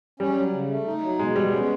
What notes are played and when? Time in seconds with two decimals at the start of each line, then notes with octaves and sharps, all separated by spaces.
0.20 G3 C#4
0.36 F#3
0.53 C#3
0.70 A3
0.86 D#4
1.03 F#3
1.19 B2 G#3
1.35 G3 B3
1.52 G#3 C#4